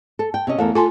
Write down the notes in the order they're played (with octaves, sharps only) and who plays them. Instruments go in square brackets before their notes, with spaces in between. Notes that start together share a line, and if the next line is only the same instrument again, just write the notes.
[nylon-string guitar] A4
G5
C3 C#4 D#5
[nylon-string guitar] E2 A4 A#4 [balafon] A3
[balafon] F4 G#5 C6 [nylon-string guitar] A4